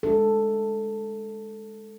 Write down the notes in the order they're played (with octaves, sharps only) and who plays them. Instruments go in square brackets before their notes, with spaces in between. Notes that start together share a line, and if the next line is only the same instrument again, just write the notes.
[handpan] G#3 D4 A4